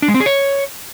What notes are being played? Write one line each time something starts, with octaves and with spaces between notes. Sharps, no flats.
D4
G#3
C4
G#4
C#5